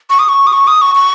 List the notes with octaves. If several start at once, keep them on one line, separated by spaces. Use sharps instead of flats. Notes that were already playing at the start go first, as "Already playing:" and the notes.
C#6
D#6
C#6
D#6
C#6
D#6
C#6
C#6